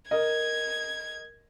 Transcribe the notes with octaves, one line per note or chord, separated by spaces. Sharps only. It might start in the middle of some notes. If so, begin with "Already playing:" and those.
A#4 D#5 G#6